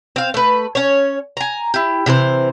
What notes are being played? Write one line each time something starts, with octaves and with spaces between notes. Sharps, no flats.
C4 F5
A3 B4
C#4 C#5
G#5 A#5
E4 G4
C3 E3 A4 C5